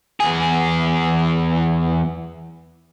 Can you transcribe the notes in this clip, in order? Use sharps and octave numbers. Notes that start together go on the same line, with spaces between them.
E2 G#4